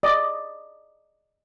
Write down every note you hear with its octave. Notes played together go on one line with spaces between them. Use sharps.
D5 D#5